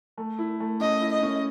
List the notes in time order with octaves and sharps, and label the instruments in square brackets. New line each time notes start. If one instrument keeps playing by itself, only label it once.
[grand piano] A3
E4
A3
[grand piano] C#4 [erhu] D#5
[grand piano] E4
[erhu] D#5
[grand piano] C#4